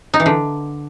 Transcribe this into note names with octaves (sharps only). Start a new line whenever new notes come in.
D#4
E3
D3